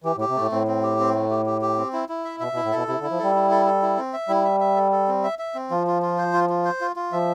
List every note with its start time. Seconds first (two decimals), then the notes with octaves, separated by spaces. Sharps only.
0.04 E3 G4
0.17 A2
0.20 G4
0.28 C3
0.36 A2 A3
0.51 A2 C4
0.67 C4
0.83 G4
0.99 C4
1.15 A3
1.31 G4
1.46 G4
1.61 G4
1.77 C4
1.93 E4
2.09 E4
2.24 E5
2.40 B2 E5
2.53 B2
2.56 E4
2.63 A2
2.72 B2 A4
2.88 C3 E4
2.99 D3
3.03 E4
3.11 F3
3.19 G3 A4
3.35 E4
3.51 A4
3.66 A4
3.82 E4
3.97 C4
4.13 E5
4.29 G3 E4
4.45 E5
4.60 E5
4.76 A4
4.92 A4
5.08 C4
5.24 E5
5.39 E5
5.55 C4
5.70 F3 F4
5.87 F4
6.02 F4
6.18 C5
6.33 F4
6.49 F4
6.65 C5
6.81 F4
6.96 F4
7.12 F3 E5